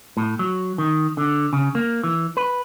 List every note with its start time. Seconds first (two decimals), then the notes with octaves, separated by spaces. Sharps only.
0.17 A2
0.39 F#3
0.78 D#3
1.17 D3
1.53 C#3
1.75 A#3
2.04 E3
2.37 B4